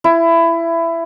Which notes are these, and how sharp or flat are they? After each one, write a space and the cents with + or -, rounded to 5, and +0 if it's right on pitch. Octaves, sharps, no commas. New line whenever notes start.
E4 +20